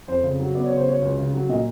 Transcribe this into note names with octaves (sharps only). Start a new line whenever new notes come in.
F2 C5
C#3
F#3
B3 D5
C#5
C#3
C5
F#3 C#5
C#2
C#3
F#3
A#2 D#5